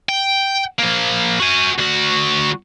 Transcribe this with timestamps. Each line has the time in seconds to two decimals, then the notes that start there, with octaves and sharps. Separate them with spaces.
0.09 G5
0.79 F3 A#3
1.40 F#4 G#5
1.79 D2 F#4